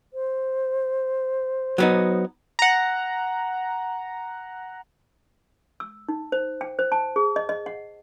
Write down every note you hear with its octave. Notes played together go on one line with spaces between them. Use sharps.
C5
F#3 B3 D#4
F#5 A#5
E6
D#4
C5
G5
C5
A5
G#4
D#5
D#5
F#5